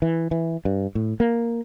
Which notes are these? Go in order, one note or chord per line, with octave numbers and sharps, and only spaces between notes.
E3
E3
G2
A2
A#3